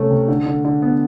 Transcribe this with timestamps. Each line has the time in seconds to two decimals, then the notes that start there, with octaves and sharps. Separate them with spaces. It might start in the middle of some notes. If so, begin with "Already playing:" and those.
Already playing: C3 A3 C#4
0.10 C3
0.28 D3
0.46 D3
0.65 D3
0.82 B3